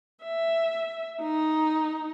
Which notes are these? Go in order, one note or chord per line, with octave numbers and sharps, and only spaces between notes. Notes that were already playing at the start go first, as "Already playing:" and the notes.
E5
D#4